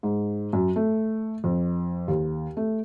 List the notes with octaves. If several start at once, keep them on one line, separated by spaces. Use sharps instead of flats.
G#2
F#2
A3
F2
D#2
A3